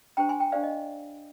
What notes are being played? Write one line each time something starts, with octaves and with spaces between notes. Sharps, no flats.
D4 G4 C5 G5 A#5
G#5 C6
G5 A#5
D4 G4 C5 D5 F5
D#5